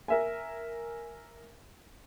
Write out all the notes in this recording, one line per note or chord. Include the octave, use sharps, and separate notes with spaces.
A#4 E5 G#5